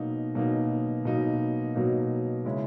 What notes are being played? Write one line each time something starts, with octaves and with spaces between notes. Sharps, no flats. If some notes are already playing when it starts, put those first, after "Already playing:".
Already playing: B2 F#3 A#3 D#4
B2 F#3 A#3 D#4
B2 F#3 A#3 D#4
B2 F#3 A#3 D#4
C#3 G#3 C#4 E4